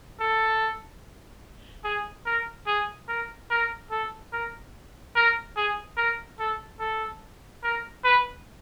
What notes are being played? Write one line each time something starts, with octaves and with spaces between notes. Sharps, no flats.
A4
G#4
A#4
G#4
A#4
A#4
A4
A#4
A#4
G#4
A#4
A4
A4
A#4
B4